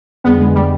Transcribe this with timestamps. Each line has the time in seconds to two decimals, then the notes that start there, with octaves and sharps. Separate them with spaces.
0.24 F2 D3 G3 B3 D4 G#4
0.40 G#3
0.55 G3